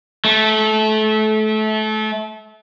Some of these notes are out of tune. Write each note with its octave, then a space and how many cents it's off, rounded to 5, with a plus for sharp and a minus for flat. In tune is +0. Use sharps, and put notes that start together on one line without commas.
A3 -25